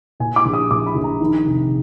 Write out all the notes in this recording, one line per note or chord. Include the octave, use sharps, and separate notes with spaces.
A#2 G#5
D6
A#1
D#6
A#1 D6
B5
A#1
A#5
D#3
F1